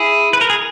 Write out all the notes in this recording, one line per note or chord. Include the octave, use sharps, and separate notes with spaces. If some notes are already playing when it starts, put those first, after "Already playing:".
Already playing: E4 G#4
B4
A#4
G#4